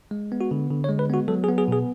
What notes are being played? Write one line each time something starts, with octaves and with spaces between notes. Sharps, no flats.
G#3
B3
F#4
D3
D3
C#5
G#3
B4
B3 F#4
F#3 A4
G#4
B3
G#4
B2 G#4